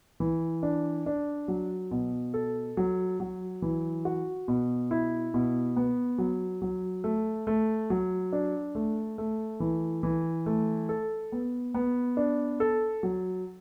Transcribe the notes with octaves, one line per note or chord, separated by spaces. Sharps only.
E3
D4
D4
F#3
B2
A4
F#3
F#3
E3
F#4
B2
E4
B2
B3
F#3
F#3
A3
A3
F#3
D4
A3
A3
E3
E3
A3
A4
B3
B3
D4
A4
F#3